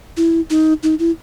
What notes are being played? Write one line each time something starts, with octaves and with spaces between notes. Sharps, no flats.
E4
D#4
D#4
E4